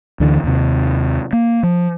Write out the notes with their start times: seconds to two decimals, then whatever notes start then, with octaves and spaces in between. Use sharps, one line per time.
0.20 D2 D3 E3
0.44 D#2 C3
1.33 A#3
1.63 F3